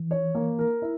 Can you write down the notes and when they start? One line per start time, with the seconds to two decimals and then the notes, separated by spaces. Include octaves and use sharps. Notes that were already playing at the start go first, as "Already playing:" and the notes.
Already playing: E3
0.11 C#5
0.35 A#3
0.59 A#4
0.82 E4